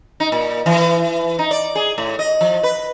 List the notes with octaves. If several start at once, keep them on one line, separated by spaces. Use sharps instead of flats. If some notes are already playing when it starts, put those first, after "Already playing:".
D#4
A#2
E3
D#4
D5
G#4
A2
D#5
F3
B4